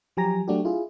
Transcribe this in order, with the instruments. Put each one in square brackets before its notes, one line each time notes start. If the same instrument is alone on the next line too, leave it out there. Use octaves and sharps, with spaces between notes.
[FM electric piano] F3 F#3 G4 G#5 A#5 A#6
F#3 A3 D4 F#4 G4
E4 F4 G#4